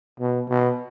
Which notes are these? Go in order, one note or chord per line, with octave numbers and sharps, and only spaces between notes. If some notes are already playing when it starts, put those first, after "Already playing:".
B2
B2